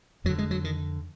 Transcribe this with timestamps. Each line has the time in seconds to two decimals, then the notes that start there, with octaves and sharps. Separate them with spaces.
0.25 F2 F#3
0.29 D3
0.38 G#3
0.51 F#3
0.64 D#3